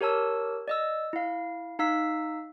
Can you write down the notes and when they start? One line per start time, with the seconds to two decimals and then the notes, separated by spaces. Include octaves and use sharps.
0.01 G4 A#4 C#5 A5 E6
0.68 D5 D#5 E6
1.13 E4 F5
1.79 D#4 F5 E6 B6